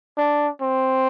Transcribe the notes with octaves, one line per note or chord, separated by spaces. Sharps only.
D4
C4